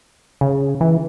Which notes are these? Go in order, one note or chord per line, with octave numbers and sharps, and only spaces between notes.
C#3
E3